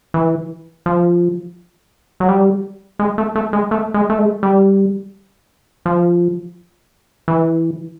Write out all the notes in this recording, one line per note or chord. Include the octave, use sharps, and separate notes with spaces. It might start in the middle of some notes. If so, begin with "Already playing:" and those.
E3
F3
F#3
G3
G#3
A3
A3
G#3
A3
G#3
A3
G#3
G3
F3
E3